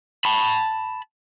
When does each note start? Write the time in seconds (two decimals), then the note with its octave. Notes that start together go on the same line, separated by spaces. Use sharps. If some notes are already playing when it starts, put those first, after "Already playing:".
0.25 A5 B5